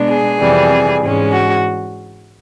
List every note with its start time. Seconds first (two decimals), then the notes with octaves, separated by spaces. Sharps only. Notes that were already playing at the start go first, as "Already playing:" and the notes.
Already playing: B2 G#3 B3 D4
0.08 G#4
0.39 F2 C3 E3 G3
1.01 G#2 E3 G#3 C#4
1.32 F#4